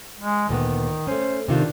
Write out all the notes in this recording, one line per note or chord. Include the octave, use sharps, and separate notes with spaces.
G#3
D2 A#2 D#3 B3
A3 C#4 C5
C3 D#3 D4 F4